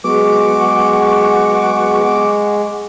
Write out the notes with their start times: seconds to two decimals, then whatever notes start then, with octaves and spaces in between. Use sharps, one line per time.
0.04 F#3 G#3 B3 G#4 F#5 C#6 D6